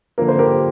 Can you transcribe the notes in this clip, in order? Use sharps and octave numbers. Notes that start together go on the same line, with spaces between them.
D3 F3 A#3 A#4
C5
G4 A#4